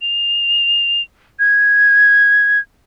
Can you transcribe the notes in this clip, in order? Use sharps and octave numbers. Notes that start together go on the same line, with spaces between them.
F7
G#6